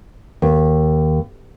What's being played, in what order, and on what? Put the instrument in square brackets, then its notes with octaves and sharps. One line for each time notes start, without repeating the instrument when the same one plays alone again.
[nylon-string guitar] D#2